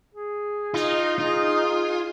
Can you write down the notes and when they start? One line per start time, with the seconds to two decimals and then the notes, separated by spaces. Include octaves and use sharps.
0.15 G#4
0.74 D#4 F4
1.19 F4 G#4